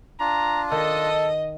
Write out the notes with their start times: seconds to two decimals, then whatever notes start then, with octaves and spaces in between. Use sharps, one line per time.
0.20 D4 F4 A#5
0.72 D#3 A4 D#5